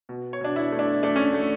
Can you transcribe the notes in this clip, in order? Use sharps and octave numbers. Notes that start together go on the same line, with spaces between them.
B2
C#5
B2 D4
E4
A3
D4
A3 D4
C#4
A3